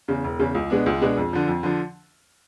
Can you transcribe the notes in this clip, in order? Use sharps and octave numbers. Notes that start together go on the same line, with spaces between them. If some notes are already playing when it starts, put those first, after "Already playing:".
E2 C#3
E1
E2 C#3
C#2
B2 G#3 B3 D4
C#2
B2 G#3 B3 D4
F2
D3 F3
F2
D3 F3